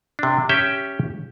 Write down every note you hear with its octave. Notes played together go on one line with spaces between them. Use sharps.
C3 D4
C#4 G4 E5 G5